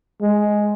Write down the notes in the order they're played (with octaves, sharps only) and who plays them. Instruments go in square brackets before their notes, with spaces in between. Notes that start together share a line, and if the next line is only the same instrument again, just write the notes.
[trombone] G#3